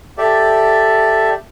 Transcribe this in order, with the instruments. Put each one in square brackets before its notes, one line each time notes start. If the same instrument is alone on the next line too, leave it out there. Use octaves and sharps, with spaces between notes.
[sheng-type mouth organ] G4 A4 D5 E5